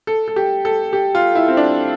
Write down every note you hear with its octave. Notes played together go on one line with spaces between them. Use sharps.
A4
A4
G4
A4
G4
F4
E4
C4
D4